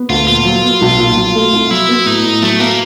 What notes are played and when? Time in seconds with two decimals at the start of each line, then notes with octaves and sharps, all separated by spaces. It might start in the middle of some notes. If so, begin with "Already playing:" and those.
Already playing: B3
0.09 D2 F4
0.27 A#2 F4
0.45 F#3
0.64 B3
0.81 B1
0.98 A#2
1.17 F#3
1.35 A3
1.52 C2
1.71 F#3 E4
1.89 B3
2.06 A2 D#4
2.24 A2
2.42 F#3 A3
2.59 A#3 B3